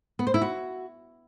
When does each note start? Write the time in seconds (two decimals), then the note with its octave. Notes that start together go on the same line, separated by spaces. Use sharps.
0.19 B3
0.27 C5
0.34 E4
0.42 F#4